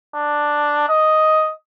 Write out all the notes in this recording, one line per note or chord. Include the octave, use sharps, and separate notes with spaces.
D4
D#5